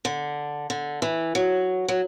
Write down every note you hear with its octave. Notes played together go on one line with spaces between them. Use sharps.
D3
D3
E3
F#3
F#3